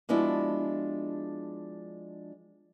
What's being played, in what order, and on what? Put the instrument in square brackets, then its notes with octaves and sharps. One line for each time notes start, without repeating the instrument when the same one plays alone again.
[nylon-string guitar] F3 G#3 B3 D4 E4 F#4